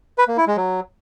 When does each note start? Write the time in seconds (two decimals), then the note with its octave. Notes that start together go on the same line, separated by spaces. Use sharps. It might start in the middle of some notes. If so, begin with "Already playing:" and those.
0.18 B4
0.28 A#3
0.37 E4
0.47 G#3
0.57 F#3